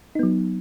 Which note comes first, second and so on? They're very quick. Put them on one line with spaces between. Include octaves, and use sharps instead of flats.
D#4 B3 F#3